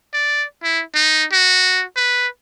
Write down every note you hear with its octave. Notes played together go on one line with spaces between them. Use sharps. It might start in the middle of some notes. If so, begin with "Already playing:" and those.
D5
E4
D#4
F#4
B4